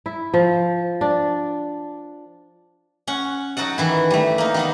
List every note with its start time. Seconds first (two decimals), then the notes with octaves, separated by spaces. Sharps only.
0.06 E4
0.34 F3
1.01 D4
3.07 C#4 F#5
3.57 F#3 D#4 F#4 A4 F#5
3.78 D#3 E3 E4
4.11 G3 A3
4.38 A#3 D#4
4.54 D#3 B3 D#4